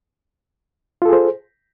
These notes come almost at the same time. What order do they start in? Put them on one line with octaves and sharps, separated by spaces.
F4 A4 G#4 C5